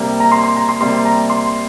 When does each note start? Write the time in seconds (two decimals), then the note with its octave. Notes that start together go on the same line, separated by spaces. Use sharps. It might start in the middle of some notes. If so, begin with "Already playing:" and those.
Already playing: C3 G3 A#3
0.20 A#5
0.32 C6
0.44 C6
0.56 A#5
0.69 C6
0.80 C3 G3 A#3 C6
1.05 A#5
1.30 C6